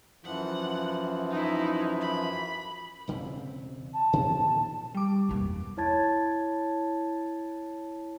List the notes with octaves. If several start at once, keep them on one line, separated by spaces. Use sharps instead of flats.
F#2 E3 F3 F#5
D#4 E4
B5
E1 C#3 C4
A5
A#2 D#3 F3
G3 D6
E2 A#3
E4 C#5 A5 G#6 A6